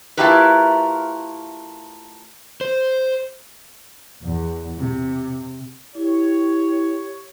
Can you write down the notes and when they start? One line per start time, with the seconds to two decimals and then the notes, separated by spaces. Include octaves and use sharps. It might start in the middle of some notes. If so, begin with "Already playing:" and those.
0.17 A3 E4 F4 G4 A#4 B4
2.61 C5
4.21 E2
4.78 C3
5.95 E4 G4 C#5